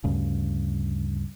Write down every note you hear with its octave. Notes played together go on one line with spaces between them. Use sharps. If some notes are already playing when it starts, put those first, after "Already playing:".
D2 G2 C#3